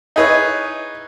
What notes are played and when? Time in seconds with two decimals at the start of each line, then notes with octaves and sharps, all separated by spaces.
0.16 D#4 E4 G#4 B4 C#5